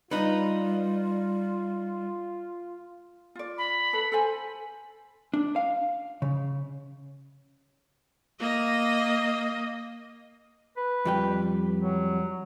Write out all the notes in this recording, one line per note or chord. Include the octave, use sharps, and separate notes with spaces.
G3 D#4 F4 B4
F4 D5
B5
A4 B4
A4 C5 G#5
D4
F5
C#3
A#3 D#5
B4
F2 G3 G5
F#3